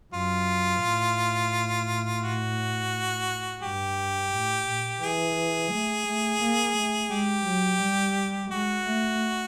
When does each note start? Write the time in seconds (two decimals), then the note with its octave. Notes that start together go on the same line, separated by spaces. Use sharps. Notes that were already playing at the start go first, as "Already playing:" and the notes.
0.13 F#2 F4
0.83 A2
2.22 F#4
3.62 G2 G4
4.31 A2
4.67 A#2
5.02 E3 G#4
5.71 A3
6.06 A3
6.41 A#3
6.76 A3
7.10 G#3 G4
7.45 F#3
7.81 G3
8.50 G#3 F#4
8.85 A3